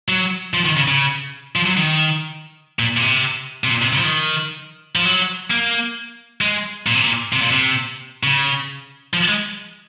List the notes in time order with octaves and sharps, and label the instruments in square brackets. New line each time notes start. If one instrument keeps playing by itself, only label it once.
[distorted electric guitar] F#3
F3
D#3
C#3
C#3
F3
F#3
D#3
A#2
A#2
C3
C3
A#2
C3
C#3
F3
D#3
F3
F#3
A#3
G#3
A#2
C3
A#2
C3
A#2
C3
C#3
F3
G#3